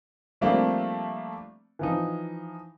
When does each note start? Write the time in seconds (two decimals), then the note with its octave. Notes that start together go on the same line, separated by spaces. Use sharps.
0.41 F3 G3 A3 A#3 C4 D4
1.79 E3 F3 D#4